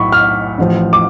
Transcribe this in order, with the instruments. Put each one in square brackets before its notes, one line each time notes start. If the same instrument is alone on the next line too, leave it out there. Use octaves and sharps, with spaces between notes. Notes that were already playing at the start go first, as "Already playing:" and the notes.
Already playing: [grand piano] B1 A2 B5 C#6
F6
A1 A2 F3
D6